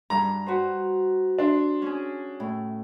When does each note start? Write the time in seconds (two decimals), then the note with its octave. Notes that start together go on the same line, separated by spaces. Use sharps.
0.10 G2 A#5
0.46 F#4 B4 C5
1.39 D4 C6
1.82 C#4 G#4
2.40 A2